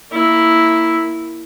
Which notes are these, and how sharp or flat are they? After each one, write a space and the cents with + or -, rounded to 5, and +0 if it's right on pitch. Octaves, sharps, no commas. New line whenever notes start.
A#3 +0 E4 +0